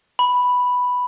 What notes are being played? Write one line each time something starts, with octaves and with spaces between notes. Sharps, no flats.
B5